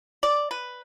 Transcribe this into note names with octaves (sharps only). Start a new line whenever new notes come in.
D5
B4